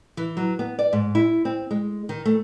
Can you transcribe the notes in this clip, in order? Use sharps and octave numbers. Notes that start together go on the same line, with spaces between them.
E3
F#3
B3
D5
G#2
E4
C4
G#3
D#3
A3